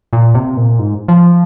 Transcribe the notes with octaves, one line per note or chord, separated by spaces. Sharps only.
A#2
C3
A#2
G#2
F3